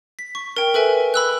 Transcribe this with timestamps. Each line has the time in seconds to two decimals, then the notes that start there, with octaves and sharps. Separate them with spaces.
0.19 B6
0.35 C#6
0.57 A#4 G5
0.74 A4 B4 E5 G#5
1.14 B5 E6 F#6